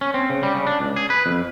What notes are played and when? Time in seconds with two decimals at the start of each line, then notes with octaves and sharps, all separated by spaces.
0.01 C#4
0.14 C4
0.30 C#3
0.43 G3
0.54 C#3
0.67 D4
0.80 C#2
0.96 G#4
1.10 B4
1.26 F2